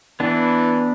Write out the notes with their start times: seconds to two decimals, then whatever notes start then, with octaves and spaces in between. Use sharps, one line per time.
0.20 E3 B3 D4